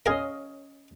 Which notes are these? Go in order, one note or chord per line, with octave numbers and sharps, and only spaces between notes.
C#4 G#4 A#4 D#5 F5